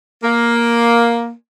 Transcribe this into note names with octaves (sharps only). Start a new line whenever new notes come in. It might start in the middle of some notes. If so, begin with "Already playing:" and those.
A#3